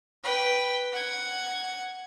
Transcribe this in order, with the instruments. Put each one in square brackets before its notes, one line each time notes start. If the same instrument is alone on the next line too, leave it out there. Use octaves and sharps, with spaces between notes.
[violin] B4 G5
F#5 G#6